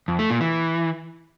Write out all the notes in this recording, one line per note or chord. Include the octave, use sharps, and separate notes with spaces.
F2
A3
A#2
E3